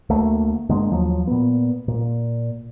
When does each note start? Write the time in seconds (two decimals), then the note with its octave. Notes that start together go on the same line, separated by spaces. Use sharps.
0.09 D2 A3 A#3
0.69 G2 D3 G#3 A#3
0.91 D#2 F3 F#3
1.27 A#2 B3
1.88 A#2